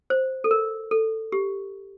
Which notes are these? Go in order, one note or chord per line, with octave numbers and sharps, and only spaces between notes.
C5
A4
A#4
A4
G4